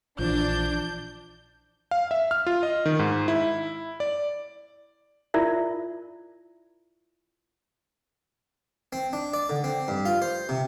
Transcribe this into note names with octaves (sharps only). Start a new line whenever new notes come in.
A#1 E3 F3 D4 G6
F5
E5
F6
F4
D#5
D#3
G#2
E4
D5
E4 F4 A#4 D5 E5
C4
D4
D5
D3
C4
G2
F4
C5
C3